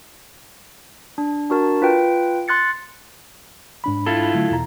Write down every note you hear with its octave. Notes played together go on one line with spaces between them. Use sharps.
D4
D4 F#4 A#4 A5
F4 B4 G5
C6 F#6 A6 C#7
G#2 D4 B5
E4 F4 A4
D3 F#3 A3
E2 B2 A#5